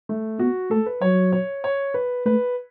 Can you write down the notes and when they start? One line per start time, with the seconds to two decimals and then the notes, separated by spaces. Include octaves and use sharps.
0.09 A3
0.39 B3 F#4
0.71 A3 A4
0.86 B4
1.02 F#3 C#5
1.32 C#5
1.64 C#5
1.94 B4
2.26 A3 B4